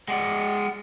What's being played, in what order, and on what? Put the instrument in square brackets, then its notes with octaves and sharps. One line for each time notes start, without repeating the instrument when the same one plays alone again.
[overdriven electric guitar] G#3 D5 [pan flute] F#5